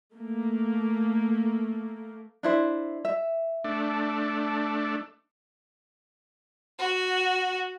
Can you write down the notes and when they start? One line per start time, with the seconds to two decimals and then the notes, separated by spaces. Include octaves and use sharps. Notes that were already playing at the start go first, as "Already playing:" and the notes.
0.14 A3 A#3
2.43 D4 E4 C5
3.05 E5
3.64 A3 D4
6.78 F#4